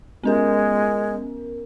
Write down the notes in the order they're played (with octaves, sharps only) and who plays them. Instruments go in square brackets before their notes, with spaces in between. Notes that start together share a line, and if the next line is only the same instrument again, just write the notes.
[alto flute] G#3 [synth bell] B3 C#4 A#4